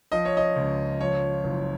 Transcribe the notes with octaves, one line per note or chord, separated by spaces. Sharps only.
F3 D#5
C#5
D#5
C#2
F3 C#5
F#1